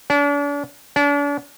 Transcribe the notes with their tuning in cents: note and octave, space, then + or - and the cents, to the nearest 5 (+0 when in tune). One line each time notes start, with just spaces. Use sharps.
D4 -40
D4 -40